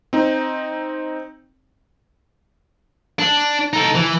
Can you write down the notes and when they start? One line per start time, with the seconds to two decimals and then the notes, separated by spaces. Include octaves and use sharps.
0.13 C4 D#4
3.19 D4
3.73 D#4 A4
3.95 E3